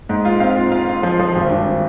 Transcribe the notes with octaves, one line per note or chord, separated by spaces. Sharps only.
G#2
F4
C4 F5
F4
F4 F5
F4
F3
F3
G#1
G2